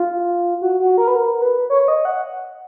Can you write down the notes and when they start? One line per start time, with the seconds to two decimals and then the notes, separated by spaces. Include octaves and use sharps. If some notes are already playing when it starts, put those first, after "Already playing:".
Already playing: F4
0.62 F#4
0.80 F#4
0.98 A#4
1.08 B4
1.15 A#4
1.42 B4
1.70 C#5
1.88 D#5
2.05 F#5